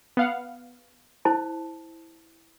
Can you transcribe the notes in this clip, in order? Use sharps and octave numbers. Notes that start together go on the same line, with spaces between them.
B3 F5 F#5
E4 C5 A5